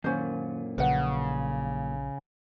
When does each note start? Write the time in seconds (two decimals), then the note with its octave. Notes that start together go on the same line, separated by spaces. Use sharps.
0.04 F#2 A#2 D#3 C#4 C5
0.78 A#1 C#3 F3 F#3 B4 F#5